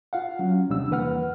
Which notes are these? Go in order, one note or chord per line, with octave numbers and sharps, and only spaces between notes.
F4 F5 F#5
F#3 C#4
D#2 C3 G3 C4 D4 E6
E2 E3 A#3 B4 F#5 F6